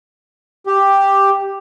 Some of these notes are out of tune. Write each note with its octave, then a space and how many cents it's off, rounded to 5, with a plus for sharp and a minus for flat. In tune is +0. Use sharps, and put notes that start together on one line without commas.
G4 +5